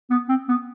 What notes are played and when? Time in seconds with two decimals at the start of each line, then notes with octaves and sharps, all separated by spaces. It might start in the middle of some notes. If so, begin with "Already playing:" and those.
0.10 B3
0.29 C4
0.48 B3